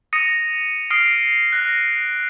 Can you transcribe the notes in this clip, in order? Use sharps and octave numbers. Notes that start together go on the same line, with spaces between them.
D#6 A#6 C#7 D#7
D#6 F6 C7 D7
F#6 A#6